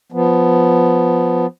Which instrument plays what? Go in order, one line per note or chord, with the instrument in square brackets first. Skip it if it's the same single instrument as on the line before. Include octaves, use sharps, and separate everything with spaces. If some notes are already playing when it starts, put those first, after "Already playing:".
[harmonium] F3 B3